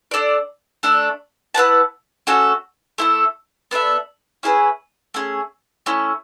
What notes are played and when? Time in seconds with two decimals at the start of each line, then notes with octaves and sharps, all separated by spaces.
0.11 D4 A4 D5
0.83 A3 D4 A4
1.54 E4 B4 F#5 A5
2.27 A3 C#4 F#4 A4
2.98 A3 E4 A4
3.71 B3 D4 A4 E5
4.43 C#4 E4 G#4 B4
5.14 A3 C#4 G#4
5.86 A3 C#4 E4